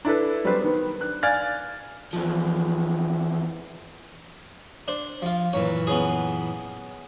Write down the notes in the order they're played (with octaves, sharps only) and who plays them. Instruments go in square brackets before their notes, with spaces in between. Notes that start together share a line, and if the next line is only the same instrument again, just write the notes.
[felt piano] D4 E4 A4 B4
F#3 G3 C4 D4 B4 C5
D#3 B3
D4 F#6
D5 F5 G#5 F6 G#6 A6
[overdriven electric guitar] E2 F3
[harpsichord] D4 C5
F3 F4
[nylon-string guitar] F#2 A#2 E3 [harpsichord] C#5
[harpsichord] B3 C#4 G#4